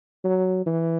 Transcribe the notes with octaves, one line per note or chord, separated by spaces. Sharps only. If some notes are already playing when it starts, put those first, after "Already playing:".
F#3
E3